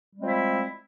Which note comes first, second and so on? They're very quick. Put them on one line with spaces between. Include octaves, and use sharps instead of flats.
G3 G#3 C4 F3 E4